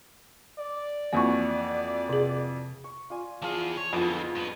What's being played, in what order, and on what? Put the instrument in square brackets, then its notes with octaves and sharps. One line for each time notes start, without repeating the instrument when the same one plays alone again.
[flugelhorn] D5
[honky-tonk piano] F2 E3 F#4 [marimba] A#3 C#6
[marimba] C3 G#4
[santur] C#6
F4 D5 G#5
[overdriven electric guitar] E3 G#4 [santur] F3 F5
[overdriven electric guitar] C#5
[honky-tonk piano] F2 [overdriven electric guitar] D3 E3 [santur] B3 F4 G#4
[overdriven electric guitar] G2 B4